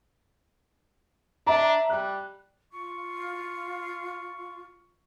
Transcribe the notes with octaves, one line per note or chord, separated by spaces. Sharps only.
D4 E5 A#5
G3 F#6
F4 C#6